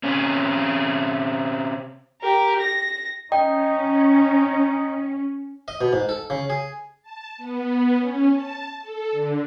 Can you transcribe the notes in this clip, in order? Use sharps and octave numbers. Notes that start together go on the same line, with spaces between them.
C3 C#4
G4 A#4
A#6
C#4 D#4 D#5 G5
D#5
B2
G#2
A4
C#3
G#4
A5
B3
C#4
A5
A4
D3